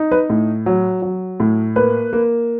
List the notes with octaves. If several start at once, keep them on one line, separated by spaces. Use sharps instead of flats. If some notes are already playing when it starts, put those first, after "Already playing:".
Already playing: D#4
B4
A2
F#3
F#3
A2
A#3 B4
A#3